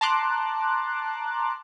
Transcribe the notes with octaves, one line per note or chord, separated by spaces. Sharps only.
A5 A#5 C6 D6 F#6